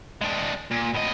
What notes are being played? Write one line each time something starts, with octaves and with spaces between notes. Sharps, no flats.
G#3 D4
A#2
A2 D#5